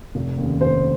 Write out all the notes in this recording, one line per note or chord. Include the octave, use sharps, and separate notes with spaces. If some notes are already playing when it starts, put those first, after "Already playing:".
F1
D#2 C#3
F1 C5